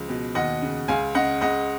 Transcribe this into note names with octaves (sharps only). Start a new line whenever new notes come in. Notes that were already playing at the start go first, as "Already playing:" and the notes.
Already playing: C#2 F3
B2
D#2 D#5 F#5
C#3
C#2 F5 G#5
C#3 D#5 F#5
C#2 D#5 F#5